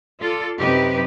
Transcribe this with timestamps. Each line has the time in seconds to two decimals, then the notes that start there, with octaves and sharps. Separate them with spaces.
0.19 F4 A4 D5
0.58 F#2 C3 D#4 G4 B4